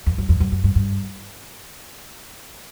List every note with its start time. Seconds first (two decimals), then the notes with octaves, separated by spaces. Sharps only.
0.06 F2
0.18 F#2
0.29 F2
0.40 F#2
0.52 F#2
0.64 G2
0.75 G2